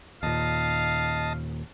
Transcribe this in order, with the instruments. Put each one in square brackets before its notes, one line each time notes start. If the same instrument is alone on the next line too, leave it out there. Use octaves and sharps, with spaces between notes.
[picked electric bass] D#2 A#2 [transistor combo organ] D#5 A5 [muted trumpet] F5